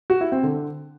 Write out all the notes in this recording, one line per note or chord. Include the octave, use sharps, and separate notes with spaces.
F#4
E4
C4
D3